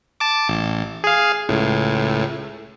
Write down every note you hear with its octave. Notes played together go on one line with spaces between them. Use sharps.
A5 D6
A1
G#4 F5
C#2 A2